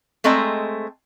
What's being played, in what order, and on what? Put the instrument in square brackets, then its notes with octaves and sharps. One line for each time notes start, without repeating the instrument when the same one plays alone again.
[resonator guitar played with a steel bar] G#3 A3 C4 D#5 A#5